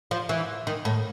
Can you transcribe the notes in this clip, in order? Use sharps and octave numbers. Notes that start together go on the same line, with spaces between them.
F3
E3
D#3
A2